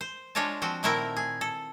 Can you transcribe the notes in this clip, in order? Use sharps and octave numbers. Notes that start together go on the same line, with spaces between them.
C5
G#3 D4 F4 C#5 D#5 A5
F3 C4 F#4
A#2 D#3 A3 C4 E4 A#4
G#4
A4